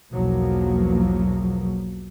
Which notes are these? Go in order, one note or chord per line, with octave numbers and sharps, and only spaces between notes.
B1 E2 B2 F3 F#3 A#3